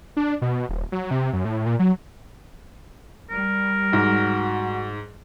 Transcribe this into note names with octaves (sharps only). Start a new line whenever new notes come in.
D4
B2
D#1
F#3
C3
F#2
A2
A#2
F#3
G3 A#4
G#2 F#4